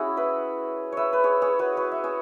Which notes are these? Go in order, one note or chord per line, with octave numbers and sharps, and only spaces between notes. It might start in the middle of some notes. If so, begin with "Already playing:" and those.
Already playing: C#4 E4 F#4 G#4
B4 E5
B4 C#5 E5
B4
G#4 C#5
G#4 C#5
F#4 B4
F#4 B4
E5
G#4 C#5